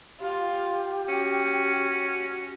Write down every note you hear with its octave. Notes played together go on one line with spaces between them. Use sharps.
F4 G4
C#4 F#4